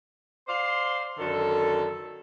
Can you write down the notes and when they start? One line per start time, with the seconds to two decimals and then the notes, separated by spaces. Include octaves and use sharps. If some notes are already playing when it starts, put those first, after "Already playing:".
0.47 C5 D5 F5 C6
1.18 F#2 D3 D#3 A4